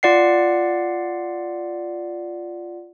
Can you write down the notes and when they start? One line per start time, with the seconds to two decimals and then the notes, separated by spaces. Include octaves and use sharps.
0.03 F4 D5 F#5 C7